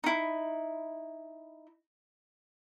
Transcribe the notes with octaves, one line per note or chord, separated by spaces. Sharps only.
D#4 E4